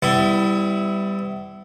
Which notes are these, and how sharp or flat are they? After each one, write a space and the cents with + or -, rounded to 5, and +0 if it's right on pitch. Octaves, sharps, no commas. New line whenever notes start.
G3 +5 B3 +40 E4 +0